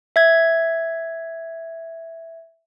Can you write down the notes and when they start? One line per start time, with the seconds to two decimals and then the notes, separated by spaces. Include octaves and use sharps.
0.16 E5 G#6